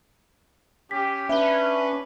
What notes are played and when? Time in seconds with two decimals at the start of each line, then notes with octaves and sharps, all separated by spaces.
0.91 C#4 G4 B6
1.29 C#4 D4 B4 E5 G7